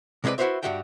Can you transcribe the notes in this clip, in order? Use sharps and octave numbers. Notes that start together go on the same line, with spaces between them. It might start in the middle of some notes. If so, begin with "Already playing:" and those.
C3 G#3 C4 E4 B4 D5
E4 F#4 G4 B4 C5 E5
G2 C#3 G3 F#4 E5 G5